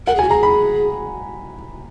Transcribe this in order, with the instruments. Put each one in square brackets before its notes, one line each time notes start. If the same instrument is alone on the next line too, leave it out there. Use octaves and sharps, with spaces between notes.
[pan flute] A#4 [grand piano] F#5
[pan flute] G#4
[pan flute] F#4 [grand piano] G#5
[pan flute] G#4 [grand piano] A#5
[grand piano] B5